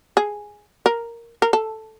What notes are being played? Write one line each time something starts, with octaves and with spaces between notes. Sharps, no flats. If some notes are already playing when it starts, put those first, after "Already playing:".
G#4
A#4
A#4
A4